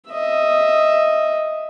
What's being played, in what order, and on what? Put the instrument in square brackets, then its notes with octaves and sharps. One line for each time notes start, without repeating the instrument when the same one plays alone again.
[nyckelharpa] D#5 E5